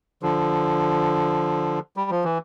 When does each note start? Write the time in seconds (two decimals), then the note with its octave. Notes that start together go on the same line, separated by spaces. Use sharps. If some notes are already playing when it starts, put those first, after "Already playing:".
0.22 D3 F3
1.97 G3
2.11 F3
2.24 E3